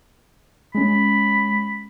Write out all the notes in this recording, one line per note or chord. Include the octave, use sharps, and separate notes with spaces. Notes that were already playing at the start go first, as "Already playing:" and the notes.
G#3 C#4 B5